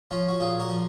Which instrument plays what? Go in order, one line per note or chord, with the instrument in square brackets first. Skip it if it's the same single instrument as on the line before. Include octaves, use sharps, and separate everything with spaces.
[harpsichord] F3 C#4 F4
F#4
A#2 F4 G#4
F#4 A#4
F3